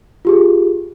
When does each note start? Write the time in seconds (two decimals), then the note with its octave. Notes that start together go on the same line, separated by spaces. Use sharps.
0.25 F4 G4 G#4